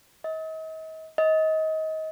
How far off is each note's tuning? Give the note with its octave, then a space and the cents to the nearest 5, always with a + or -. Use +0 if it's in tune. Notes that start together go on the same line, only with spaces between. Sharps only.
D#5 +40
D#5 +25